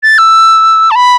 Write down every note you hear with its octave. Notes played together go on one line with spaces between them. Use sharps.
A6
E6
A5
B5